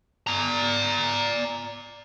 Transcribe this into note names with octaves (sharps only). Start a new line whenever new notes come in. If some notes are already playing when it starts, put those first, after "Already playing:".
D5 A#5